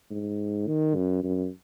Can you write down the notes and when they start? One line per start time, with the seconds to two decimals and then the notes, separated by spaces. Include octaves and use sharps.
0.11 G#2
0.67 D#3
0.96 F#2
1.23 F#2